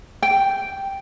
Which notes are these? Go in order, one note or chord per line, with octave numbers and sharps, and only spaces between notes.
G5